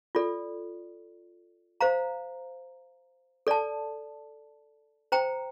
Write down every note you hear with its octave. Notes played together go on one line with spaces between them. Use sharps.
F4 A4 D5
C5 F5 A#5
A4 D5 A5
C5 G5 A#5